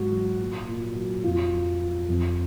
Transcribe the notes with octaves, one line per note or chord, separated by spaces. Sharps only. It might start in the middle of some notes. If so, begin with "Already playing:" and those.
Already playing: G#2 F#3 F#4
F#3
A#2
A#2
F#3
F2 F4
F3
F3
F2